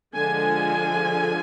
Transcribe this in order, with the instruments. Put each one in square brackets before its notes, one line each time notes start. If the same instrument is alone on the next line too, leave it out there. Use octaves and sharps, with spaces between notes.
[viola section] D3 F3 G#3 G#5